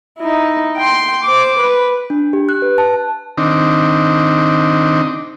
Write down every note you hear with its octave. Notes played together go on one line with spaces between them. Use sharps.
D#4 E4
G5 C6
C5 D6
B4
D4
G4
F#6
B4
A5
D#3 C4 D4 D#4